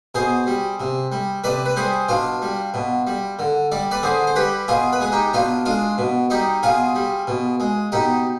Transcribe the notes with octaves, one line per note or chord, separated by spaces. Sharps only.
B2 G#4 C5
G3
C3
G3
C3 B4 D5
B4
G3 G#4 C5
B2 D4 F4
G3
B2
G3
D3
G3 D5
B4 D5
D3 G#4 C5
C5
G3 G4 B4
B2 F4 G#4
B4
G#3 G#4
D#4 G4
B2 D4 F4
G#3 D4 F4
B2
G3 D#4 G4
B2 F4 G#4
G3
B2
G#3
B2 D#4 G4